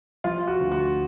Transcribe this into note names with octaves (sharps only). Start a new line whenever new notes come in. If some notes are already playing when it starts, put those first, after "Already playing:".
F3 F4
F#4
D2
F#4